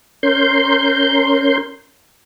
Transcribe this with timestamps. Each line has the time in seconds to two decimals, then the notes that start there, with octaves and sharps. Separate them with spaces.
0.23 C#4 A#4 C6 G6